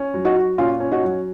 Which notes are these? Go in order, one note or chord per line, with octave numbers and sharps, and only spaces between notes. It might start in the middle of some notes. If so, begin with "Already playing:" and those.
Already playing: C#4
F#3
D#4 F#4
F#4
A#2 C#4 F4
C#4
D#4 F#4
F#3